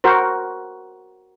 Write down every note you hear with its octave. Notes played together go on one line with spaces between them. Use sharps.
F#4 A#4 C5